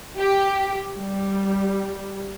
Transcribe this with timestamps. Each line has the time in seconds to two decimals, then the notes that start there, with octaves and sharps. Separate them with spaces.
0.19 G4
0.96 G3